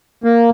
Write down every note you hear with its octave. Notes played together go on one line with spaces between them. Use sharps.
A#3